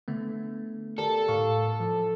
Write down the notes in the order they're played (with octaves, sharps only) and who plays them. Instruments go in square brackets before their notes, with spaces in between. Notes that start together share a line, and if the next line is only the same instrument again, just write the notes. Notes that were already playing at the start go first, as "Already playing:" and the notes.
[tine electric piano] D3 A3 B3
[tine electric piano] G4 A#4 D5 [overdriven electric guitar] A4
[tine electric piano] A2 F5 C#6
F3